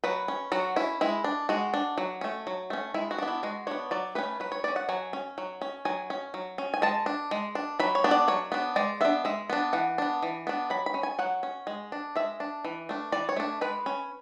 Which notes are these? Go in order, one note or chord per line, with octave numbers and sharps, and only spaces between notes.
F#3 B4
C#4
F#3 F#4
C#4 E4
G#3 E4
D4
G#3 F#4
D4
F#3
A3 C#4
F#3
A3 C#4
G#3 E4
F#4
B3 D4
E4
G#3 F#4
B3 D4 C#5
F#3 D5
A3 C#4 B4
F#3 B4
C#5
A3 C#4 D5
F#5
F#3 G#5
C#4
F#3
C#4
F#3 G#5
C#4
F#3
C#4
G#5
G#3 A5
D4
G#3
D4
F#3 B5
C#5
B3 D4
D5
F#3 C#5
B3 D4
G#3 D5
B3 D4 E5
G#3 E5
B3 D4
E3 F#5
B3 D4
E3
B3 D4
F#3 B5
B5
C#4
G#5
F#3 F#5
C#4
G#3
D4
G#3 E5
D4
E3
A3 D4
E3 D5
C#5
A3 D4
G#3 B4
C#4